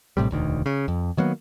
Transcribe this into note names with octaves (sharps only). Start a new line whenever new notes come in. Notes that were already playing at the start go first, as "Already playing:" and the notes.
A#1 A2 C3 G3
E1 D2 D#3
C#3
F2
D#3 F#3 A#3 B3